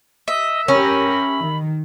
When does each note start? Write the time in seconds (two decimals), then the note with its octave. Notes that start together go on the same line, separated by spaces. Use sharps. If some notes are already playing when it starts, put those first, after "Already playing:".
0.28 D#5 E5
0.68 C#4 G4 A#4 B5
1.40 D#3